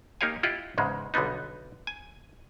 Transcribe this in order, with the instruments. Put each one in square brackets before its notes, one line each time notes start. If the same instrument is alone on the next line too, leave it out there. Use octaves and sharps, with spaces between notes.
[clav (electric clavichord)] A#3 D#4 G4 C#5 F5 G#5
E4 F4 G4 D#5 F#5
E2 G#2 C#3 G#3
B1 D3 G3 B3 D#4
G#5